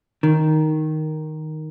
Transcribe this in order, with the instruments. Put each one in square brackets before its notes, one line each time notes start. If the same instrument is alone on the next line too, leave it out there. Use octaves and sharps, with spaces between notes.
[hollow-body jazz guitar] D#3